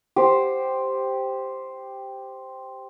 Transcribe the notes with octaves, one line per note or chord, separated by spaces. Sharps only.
G4 C5